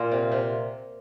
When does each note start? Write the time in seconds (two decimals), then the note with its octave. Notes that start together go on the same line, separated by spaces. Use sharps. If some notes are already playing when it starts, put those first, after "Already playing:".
Already playing: A#2 A#3 F4
0.11 C3
0.32 C3